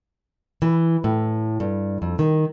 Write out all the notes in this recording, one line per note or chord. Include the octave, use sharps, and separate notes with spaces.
E3
A2
G2
F2
D#3